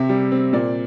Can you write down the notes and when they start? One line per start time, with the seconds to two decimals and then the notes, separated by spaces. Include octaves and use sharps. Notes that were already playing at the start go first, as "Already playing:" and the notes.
Already playing: C3 C4 E5
0.09 G3
0.32 C4
0.53 A#2 D5